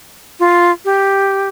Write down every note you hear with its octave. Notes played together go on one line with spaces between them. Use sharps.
F4
G4